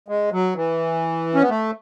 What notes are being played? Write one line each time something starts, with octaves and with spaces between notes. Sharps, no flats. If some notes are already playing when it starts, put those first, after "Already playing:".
G#3
F#3
E3
C#4
B3
A3